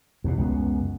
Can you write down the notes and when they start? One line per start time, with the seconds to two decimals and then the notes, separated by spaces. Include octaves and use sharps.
0.24 E2 G2 B2
0.38 C#2 F#2 D#3 B3